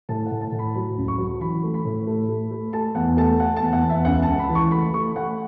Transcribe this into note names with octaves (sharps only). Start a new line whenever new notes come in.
A2 A5
F#5
A2
A5
A2
B5
F#3 B5
C#2
C#6
F#3
E3 B5
A3
B5
A2
A3
A3
A3
A3 A5
E2 F#5
A3 A5
A3 F#5
A5
E2
F#5
E2
E5
C#2 F#5
C#2 A5
B5
E3
C#6
A3 B5
A3 C#6
A3 F#5